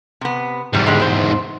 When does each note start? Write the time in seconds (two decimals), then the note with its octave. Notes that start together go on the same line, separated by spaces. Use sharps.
0.21 C3 B3
0.73 E2 G#2 C3 G3
0.87 D3 G3 G#3
1.00 C4 C5